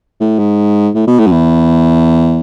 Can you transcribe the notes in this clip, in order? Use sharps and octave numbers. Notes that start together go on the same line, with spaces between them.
A2
G#2
A2
B2
A2
F#2
E2